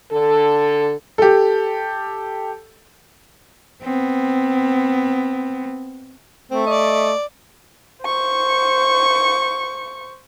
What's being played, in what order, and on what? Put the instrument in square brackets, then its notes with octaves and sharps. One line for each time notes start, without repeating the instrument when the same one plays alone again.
[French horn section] D3 A4
[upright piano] G4 A4
[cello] B3 C4
[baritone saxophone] A3 [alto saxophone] C4
[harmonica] D5 [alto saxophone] D#5
[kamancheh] C5 C#6